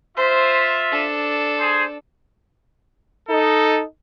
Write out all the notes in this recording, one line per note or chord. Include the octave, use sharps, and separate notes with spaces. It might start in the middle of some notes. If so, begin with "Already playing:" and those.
F4 C5 E5
D4 A4
G#4 C5
D#4 A4